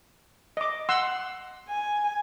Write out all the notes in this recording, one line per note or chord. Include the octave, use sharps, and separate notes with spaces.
D#5 D6
F#5 C6 E6
G#5